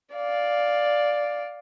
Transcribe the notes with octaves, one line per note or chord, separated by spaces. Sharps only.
D5 F5